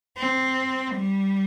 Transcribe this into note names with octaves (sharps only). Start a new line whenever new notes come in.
C4
G3